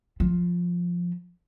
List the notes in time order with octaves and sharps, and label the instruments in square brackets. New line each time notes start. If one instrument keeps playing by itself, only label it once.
[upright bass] F3